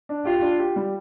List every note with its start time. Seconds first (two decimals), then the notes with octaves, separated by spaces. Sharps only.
0.09 D4
0.25 F4 G4
0.42 D4
0.59 G4
0.76 G3